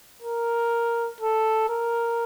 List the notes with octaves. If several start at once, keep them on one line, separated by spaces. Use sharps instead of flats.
A#4
A4
A#4